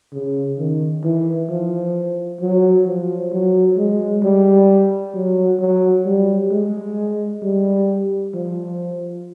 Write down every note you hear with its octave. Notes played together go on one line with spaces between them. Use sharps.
C#3
D#3
E3
F3
F#3
F3
F#3
G#3
G3
F#3
F#3
G3
G#3
G3
F3